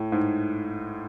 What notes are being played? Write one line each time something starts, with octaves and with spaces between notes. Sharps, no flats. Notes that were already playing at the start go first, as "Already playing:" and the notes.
Already playing: A2
G#2